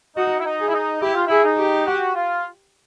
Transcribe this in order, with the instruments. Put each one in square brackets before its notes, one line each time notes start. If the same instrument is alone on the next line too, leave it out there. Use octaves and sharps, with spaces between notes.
[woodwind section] D#4 [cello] F#4
[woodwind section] E4
D#4
[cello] G#4
[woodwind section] E4
D#4
[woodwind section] E4 [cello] G4
[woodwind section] F4
[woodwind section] E4 [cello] G#4
[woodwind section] D#4
[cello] G4
[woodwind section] F#4
F4